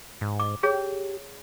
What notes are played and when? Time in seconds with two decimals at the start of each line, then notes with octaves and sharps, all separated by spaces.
0.21 G#2
0.40 D6
0.63 G4 G#4 C#5